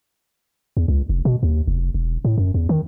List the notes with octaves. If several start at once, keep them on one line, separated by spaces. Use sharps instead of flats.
E2
C#2
F1
B2
D#2
F1
E1
A2
F#2
E2
D#3